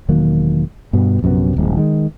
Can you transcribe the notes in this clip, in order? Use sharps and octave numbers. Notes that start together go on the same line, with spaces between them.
E1 D#3 F#3 A#3
G2 B2 B3
A#1 F#2 C3 B3
D#1 A#1 G#2
D#3 G#3